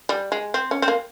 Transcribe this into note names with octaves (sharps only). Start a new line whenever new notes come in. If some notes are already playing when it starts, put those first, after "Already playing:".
G3
G#3
C4
C#4
C4
A#3